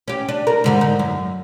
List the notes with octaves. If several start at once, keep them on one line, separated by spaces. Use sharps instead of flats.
C#4 G4
D4
A#4
G#2 D3 G3
D#4
F#2